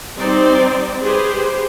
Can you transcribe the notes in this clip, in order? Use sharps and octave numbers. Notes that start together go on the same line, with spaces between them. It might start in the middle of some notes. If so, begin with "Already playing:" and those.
G3 C4 D#4 C5 D5
G4 G#4 B4 C5